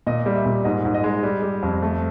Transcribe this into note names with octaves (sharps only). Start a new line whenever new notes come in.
A#2 D#5
G3
E5
A#2
G#2 D#5
G#2
D#5
G#3
G3
G3
F2
A3